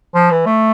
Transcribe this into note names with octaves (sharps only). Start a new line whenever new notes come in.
F3
E3
A3